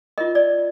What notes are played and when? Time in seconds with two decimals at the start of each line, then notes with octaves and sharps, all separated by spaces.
0.18 F4 A#4 D#5
0.35 D5